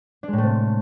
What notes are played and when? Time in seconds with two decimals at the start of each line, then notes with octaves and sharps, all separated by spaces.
0.23 D4
0.28 G#3
0.33 A2
0.38 A3
0.43 C3